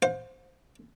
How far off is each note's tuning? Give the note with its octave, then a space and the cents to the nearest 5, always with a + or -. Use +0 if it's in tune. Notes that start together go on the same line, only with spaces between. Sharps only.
C5 +0 F5 +45